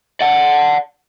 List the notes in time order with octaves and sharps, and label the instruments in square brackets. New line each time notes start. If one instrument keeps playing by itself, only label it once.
[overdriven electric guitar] D5 F#5